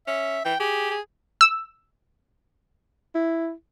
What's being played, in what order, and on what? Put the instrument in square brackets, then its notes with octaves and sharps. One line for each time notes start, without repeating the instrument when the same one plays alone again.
[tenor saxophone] C#4 [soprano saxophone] E5
[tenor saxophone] E3 [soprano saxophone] G5
[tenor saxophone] G4 [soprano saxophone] G#4
[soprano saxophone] G#4
[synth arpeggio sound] E6
[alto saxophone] E4